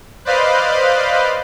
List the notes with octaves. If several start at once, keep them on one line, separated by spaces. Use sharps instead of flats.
B4 C5 D5 D#5 F5 B5